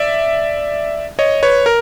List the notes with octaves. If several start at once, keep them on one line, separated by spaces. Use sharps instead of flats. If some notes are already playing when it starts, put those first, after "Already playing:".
Already playing: D5 E5
C#5 D#5
B4 C#5
A#4